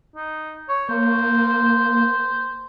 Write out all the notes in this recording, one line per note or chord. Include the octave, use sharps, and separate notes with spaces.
D#4
C#5
A#3 C5